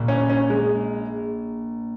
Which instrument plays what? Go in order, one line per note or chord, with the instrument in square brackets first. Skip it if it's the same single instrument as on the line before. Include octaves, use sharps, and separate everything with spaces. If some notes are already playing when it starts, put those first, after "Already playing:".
Already playing: [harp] A#1 A#2 A#3
[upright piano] C#4
C#4
G#3